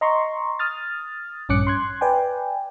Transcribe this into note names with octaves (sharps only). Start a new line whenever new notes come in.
D#5 A#5 C6 C#6
D#6 F6 A6
A#1 G2 C#4 D6 F#6 C#7
C6 F#6 G#6
B4 D5 G5 G#5